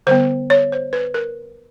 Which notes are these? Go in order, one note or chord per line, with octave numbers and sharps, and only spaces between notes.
D3 G3 B3 C5
C#5
C5
B4
A#4